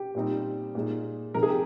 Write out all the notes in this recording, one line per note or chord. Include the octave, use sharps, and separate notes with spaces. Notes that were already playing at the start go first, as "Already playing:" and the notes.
Already playing: G4
A#2 G3 C4 D#4
A#2 G#3 D#4
C3 F3 G#3 D#4 A#4
G#4
G4